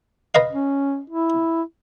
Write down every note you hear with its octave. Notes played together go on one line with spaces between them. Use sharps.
B4 D#5 F5
C#4
E4